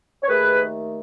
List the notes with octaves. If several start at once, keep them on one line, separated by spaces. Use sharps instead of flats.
C#5
D#2 D#3 A3 G#4 B4